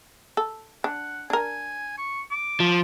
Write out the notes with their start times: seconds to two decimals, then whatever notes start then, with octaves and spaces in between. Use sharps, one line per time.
0.37 A4
0.84 D4 F#5
1.30 D4 A#4 G#5
1.98 C#6
2.31 D6
2.60 F3